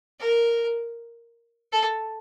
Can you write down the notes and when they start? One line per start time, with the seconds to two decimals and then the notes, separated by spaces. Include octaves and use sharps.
0.19 A#4
1.72 A4